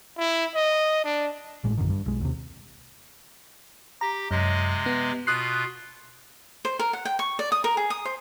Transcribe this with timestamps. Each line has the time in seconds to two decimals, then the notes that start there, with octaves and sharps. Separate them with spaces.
0.18 E4
0.55 D#5
1.04 D4
1.64 G#1 A2 G#3
1.77 A#1 F#2 D3 D#3
1.90 G2
2.06 B1 G#3
2.21 D#2 C3
4.01 G4 A#5
4.31 F#2 C3 G#3 D#5
4.86 B3
5.27 B2 F4 D#6 F#6 C7
6.65 C5
6.79 A#4
6.93 F#5
7.05 G5
7.19 C#6
7.39 D5
7.52 D#6
7.64 A#4
7.77 G#4
7.90 D#6
8.05 C5